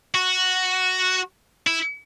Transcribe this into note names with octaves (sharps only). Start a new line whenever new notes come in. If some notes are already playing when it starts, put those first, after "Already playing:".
F#4
E4